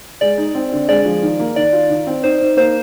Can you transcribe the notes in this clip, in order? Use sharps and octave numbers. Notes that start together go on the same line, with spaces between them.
G#3 D5
D#4
C4
D3
G#3 D5
F3
D#3
A#3
D#3 D5
F4
D#3
C4
D#4 C5
D#4
A#3 C5